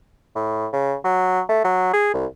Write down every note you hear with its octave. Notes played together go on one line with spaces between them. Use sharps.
A2
C#3
F#3
A3
F#3
G#4
C2